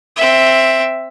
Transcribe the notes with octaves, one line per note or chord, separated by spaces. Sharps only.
C4 E5